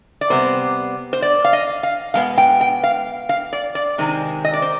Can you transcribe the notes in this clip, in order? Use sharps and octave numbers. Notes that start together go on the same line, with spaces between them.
D5
C3 G3 B3 C5
C5
D5
F5
D#5
F5
B2 G#3 B3 F5
G5
G5
F5
F5
D5
D5
C3 D#3 G#3 C4
D#5
D5
C5